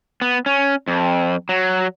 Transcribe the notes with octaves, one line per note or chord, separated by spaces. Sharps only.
B3
C#4
F2
F#3